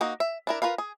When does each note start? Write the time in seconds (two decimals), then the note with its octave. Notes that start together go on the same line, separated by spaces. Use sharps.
0.01 A#3 D#4 F#4
0.20 E5
0.47 D4 E4 A#4
0.62 F4 A#4 B4 F5
0.78 G#4